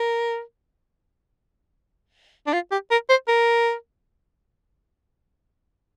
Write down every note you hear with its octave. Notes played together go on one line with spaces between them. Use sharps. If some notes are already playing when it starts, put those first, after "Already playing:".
Already playing: A#4
D4
F4
G4
A#4
C5
A#4